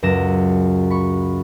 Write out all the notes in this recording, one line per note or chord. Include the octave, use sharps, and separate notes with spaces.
C#2 F#2 D6 A#6 E7
B5 C#6